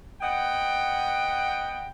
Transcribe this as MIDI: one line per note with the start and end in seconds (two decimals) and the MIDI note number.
0.21 1.86 59
0.21 1.86 75
0.21 1.86 78
0.21 1.86 79